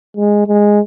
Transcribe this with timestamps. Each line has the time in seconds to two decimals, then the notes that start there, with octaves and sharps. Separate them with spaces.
0.17 G#3
0.47 G#3